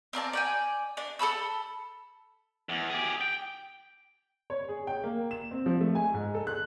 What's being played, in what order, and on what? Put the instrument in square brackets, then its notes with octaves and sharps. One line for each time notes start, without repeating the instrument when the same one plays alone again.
[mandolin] C4 A#4 D5 A5
D5 G5 G#5
D4
A4 A5 B5 E6
[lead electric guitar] E2
G4 G#4
G5
[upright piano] C#5
G#4
G5
A#3
E7
C4
F3
A3
G#5
G#2
A4
F#6